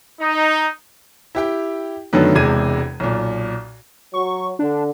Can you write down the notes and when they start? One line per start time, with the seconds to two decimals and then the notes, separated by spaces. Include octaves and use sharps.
0.20 D#4
1.35 E4 G4 G5
2.13 F#2 D3 D#3 F#3 A3 B3
2.35 E1 E2 C3 G#3 G#6 D#7
3.00 B1 A#2
4.14 F#3 C#6
4.59 D3 D4